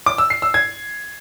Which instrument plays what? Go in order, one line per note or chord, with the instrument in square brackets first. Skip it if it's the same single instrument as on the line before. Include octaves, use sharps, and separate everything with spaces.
[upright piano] D6
E6
C7
E6
G#6